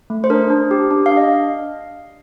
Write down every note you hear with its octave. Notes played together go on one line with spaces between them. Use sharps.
A3
C5
D4 A#4
D4
G4
D4
F5
D4
D#5